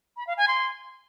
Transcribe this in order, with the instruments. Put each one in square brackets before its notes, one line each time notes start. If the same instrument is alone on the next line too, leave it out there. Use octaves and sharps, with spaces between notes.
[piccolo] B5
F5
G#5
C6